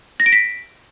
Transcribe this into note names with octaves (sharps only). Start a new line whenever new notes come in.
A#6
D7
B6